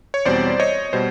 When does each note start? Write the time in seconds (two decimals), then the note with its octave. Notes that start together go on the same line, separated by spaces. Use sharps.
0.14 C#5
0.25 E2 B2 G3 C4 C5 D5
0.60 C#5 D#5
0.93 B2 G3 C5